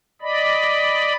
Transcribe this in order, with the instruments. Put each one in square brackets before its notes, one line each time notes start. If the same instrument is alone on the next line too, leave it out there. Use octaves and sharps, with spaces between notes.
[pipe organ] D5 D#5 B5